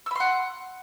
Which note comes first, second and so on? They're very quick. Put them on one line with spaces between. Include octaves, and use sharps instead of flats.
E6 B5 C6 F#5